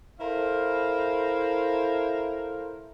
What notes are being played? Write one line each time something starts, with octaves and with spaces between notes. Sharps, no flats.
E4 A4 A#4 C5 F5